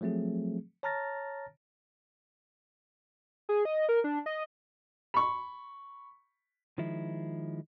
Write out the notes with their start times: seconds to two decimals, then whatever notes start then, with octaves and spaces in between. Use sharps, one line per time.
0.01 F3 F#3 A3 C4 G#4
0.83 C#5 A5 A#5 F6 A6 A#6
3.49 G#4
3.65 D#5
3.89 A#4
4.04 D4
4.26 D#5
5.14 B5 C#6
6.78 D#3 F3 G#3 E4